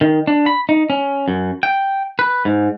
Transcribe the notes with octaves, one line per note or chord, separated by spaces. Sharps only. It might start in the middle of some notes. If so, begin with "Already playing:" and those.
D#3
D4
B5
D#4
C#4
F#2
G5
B4
G#2